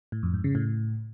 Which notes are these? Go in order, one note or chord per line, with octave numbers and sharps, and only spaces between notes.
A2
F2
G#2
C#3
A2